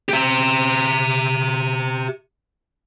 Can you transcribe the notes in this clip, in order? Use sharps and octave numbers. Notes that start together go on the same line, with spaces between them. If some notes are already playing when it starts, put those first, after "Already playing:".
G4 E5